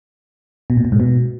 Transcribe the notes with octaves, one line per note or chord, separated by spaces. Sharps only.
B2
A#2
B2
G#2
B2